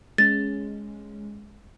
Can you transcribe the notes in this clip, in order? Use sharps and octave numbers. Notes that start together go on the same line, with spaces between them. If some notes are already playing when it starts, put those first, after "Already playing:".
G#3 C#4 A6